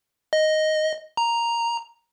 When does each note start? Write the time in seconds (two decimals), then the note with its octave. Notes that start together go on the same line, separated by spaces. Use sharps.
0.33 D#5
1.17 A#5